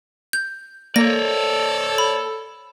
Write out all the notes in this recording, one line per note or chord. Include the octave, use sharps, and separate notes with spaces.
G6
A#3 A4 C#5 D5 A#6
B5